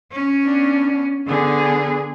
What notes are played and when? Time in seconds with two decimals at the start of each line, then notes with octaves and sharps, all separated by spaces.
0.12 C#4
0.44 B3 D4
1.27 D3 B3 G#4